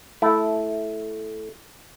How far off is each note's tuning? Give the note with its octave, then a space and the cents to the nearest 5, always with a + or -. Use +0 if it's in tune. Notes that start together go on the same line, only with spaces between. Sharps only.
A3 -10 E4 +0